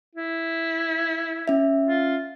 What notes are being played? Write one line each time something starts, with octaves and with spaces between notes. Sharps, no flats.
E4
C#4 E5
F4